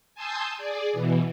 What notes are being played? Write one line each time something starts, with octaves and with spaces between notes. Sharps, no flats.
G#5 A5 C6 D#6 E6 G6
G#4 D5
B2 E3